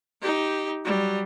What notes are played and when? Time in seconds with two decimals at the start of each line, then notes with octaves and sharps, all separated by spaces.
0.22 D#4 G4
0.85 F#3 G3